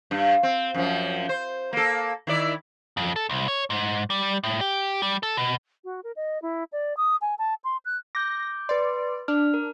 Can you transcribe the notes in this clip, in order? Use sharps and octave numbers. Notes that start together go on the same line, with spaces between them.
G2
C4
F#2 F3
C5
A#3 A4
D#3 E4 D5
F2
A4
C2
C#5
G#2
G3
A2
G4
G3
A4
B2
F#4
A#4
D#5
E4
D5
D#6
G#5
A5
C6
F#6
D6 G6 A#6
B4 D5 C6
D4 F6
A#4